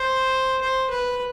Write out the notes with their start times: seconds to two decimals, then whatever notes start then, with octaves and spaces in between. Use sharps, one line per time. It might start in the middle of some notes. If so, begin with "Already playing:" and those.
Already playing: C5
0.61 C5
0.90 B4